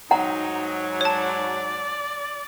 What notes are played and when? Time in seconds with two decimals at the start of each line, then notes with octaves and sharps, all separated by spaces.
0.11 G#2 F#3 D#4 F#5 A#5
1.01 C#5 D5 A5